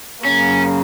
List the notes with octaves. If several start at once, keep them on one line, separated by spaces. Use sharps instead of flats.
F#2 C#3 A#3 C#4